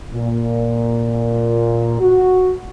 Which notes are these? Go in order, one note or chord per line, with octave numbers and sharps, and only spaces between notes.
A#2
F#4